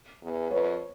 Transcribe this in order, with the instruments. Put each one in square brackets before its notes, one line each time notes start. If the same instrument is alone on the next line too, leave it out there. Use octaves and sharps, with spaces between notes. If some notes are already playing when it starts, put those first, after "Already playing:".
[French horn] E2
[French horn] F2 [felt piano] B4 C#5